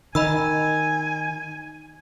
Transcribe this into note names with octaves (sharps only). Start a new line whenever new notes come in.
D#3 D#5 G#5 B5 E6